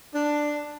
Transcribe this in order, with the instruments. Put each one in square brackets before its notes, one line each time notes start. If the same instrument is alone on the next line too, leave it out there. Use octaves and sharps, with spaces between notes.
[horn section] D4